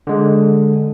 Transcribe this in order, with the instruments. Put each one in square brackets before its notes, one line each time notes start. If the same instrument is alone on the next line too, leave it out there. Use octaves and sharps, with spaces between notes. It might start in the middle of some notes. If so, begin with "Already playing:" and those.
[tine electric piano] D3 G#3